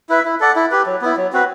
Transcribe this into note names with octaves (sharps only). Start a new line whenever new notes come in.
E4 B4 E5
E4
A4 D5 F#5
E4
G4 B4
F#3
B3 E4
F#3
C4 F#4 B4